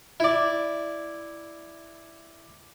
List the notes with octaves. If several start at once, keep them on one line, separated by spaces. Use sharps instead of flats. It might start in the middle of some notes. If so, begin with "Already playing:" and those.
E4 D5